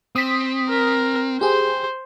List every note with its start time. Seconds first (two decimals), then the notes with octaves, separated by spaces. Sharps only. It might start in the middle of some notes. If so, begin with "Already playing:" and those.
0.16 C4 D#6 B6
0.69 A#4
1.41 G4 G#4 C5